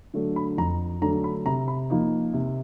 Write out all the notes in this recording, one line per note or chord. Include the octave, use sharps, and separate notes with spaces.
D3 F#3 A3 D4
B5
F2 A#5
D3 F#3 A3 D4 A#5
B5
C3 A#5
B5
F3 A#3 D#4
C3